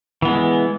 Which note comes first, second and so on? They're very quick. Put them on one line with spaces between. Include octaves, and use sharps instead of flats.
E3 B3 G#3